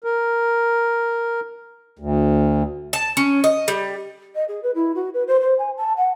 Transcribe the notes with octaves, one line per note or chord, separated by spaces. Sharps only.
A#4
D2
A5
C#4
D#5
G3
D#5
G#4
B4
E4
F#4
B4
C5
C5
G#5
A5
F#5